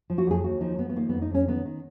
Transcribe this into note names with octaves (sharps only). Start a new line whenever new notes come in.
F3
F#4
F2 G#4
D#2 F#4
F3 D#4
F3 B3
B3
D#3 A#3
F2 B3
D#4
F2 C#4
D#3 B3
D#3